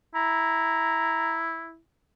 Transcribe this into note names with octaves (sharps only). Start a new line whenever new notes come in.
E4 A#5